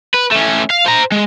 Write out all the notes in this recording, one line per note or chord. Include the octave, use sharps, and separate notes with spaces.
B4
A3 C#4
F5
C5 A#5
G#3